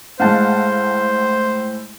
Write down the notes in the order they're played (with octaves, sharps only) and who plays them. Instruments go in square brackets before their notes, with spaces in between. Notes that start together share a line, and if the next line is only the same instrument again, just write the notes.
[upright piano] A2 G#3 [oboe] C5 [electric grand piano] F5 F#5 A5